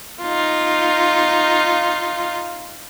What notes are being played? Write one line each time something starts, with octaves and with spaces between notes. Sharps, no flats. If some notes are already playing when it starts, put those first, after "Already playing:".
D#4 F4